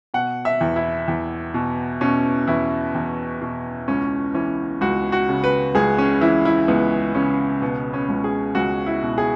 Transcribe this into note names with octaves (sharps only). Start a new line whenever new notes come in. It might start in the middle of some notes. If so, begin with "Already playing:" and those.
B2 F#5
E5
E2
E4
E2
B2
B2 C#4
E2 E4
E2
B2
C#2 C#4
E3 C#4
C#2 F#4
F#4
C#3
B4
C#2 G#4
C#4
E3 E4
E4
C#2 B3
C#3 C#4
B2 B3
C#4
C#2
G#4
C#2 F#4
E4
B2
G#4